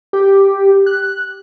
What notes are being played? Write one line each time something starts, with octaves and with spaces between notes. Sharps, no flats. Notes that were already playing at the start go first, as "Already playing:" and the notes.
G4
F#6